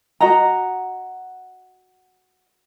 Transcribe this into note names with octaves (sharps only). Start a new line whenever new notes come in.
F#4 D#5 F#5 A#5